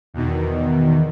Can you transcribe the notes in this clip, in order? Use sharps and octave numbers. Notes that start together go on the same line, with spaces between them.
E2 B2 D#3